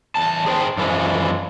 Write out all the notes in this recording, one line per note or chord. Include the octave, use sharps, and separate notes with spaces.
E2 A5
G#4 C5 G5
F#2 E3 F3 G#3